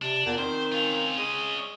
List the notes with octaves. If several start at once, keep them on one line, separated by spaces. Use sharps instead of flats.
C3 D4
E2 A#2
D#3 C4 C5
C#4 F4
G#3 C#4 D#5